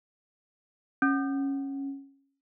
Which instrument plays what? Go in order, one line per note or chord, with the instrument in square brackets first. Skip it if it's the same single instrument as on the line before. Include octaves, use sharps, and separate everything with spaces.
[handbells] C#4